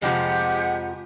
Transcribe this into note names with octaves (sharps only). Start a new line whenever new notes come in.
F2 C3 F3 G#3 G4 F#5